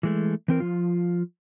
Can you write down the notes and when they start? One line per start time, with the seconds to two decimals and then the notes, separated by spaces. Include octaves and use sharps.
0.03 E3 G#3 A3
0.48 E3 C4 A#4
0.60 F3 F4